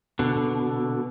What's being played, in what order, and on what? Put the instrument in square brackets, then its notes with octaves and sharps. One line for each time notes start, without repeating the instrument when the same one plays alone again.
[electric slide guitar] B2 D3